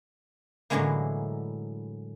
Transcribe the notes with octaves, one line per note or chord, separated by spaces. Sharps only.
A2 D3 E3 F#3 G#3 A#3